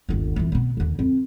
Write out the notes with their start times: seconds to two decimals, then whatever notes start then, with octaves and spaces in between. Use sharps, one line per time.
0.09 G1 D#2
0.36 F2 E3
0.52 B2 B3
0.77 D#2 D3
0.99 F2